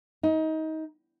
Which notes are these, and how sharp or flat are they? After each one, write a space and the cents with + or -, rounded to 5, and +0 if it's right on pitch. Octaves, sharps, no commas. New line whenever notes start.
D#4 +25